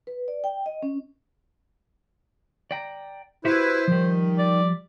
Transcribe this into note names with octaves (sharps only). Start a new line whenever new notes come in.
B4
D5
G5
D#5
C#4
D5 G5 A#5
E4 F#4 G4 B4 C5 E5
D#3 F3 G3
D5